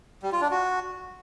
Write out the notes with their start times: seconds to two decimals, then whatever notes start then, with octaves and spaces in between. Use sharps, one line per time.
0.23 G3
0.32 F4
0.42 D4
0.51 F#4